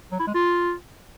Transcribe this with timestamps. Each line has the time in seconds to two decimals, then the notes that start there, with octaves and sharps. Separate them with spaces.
0.12 F#3
0.20 E4
0.27 G#3
0.35 F4